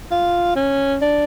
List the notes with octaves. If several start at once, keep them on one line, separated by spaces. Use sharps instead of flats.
F4
C#4
D4